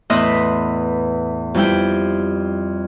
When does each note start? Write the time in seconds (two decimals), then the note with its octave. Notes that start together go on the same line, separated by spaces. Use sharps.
0.10 E2 A2 B4 D#5 E5 C6
1.54 F2 G3 E4 G5